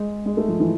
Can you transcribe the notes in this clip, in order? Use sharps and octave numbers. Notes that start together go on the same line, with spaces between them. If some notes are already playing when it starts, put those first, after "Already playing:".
Already playing: G#3
G#3
A3
F3
E3